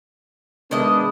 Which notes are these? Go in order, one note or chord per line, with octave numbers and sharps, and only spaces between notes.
D#3 G#3 B3 D4 E4 D#5